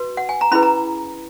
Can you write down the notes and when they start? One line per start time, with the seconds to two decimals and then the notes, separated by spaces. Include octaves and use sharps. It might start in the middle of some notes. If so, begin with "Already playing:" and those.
Already playing: F#4 B4
0.17 F#5
0.29 G#5
0.41 A#5
0.51 C#4 E4 G#4 B4 B5
0.63 A#5